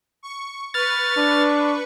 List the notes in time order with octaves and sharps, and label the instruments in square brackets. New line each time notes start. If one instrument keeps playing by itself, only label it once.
[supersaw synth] C#6
[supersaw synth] B4 C#6 [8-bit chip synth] F6 A6
[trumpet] D4